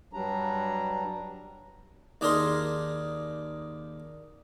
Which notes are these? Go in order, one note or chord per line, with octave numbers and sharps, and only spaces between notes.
G2 F#3 G3 D4 A#5
D#2 D4 D#4 G#4 A#4 C6